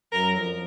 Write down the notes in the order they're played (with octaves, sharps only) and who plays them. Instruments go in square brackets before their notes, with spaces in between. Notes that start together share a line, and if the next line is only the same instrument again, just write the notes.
[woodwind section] F#2 F#3 [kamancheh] A#4
[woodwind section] F2 F3